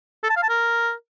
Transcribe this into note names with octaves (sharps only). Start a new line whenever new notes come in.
A4
A5
F5
A5
A#4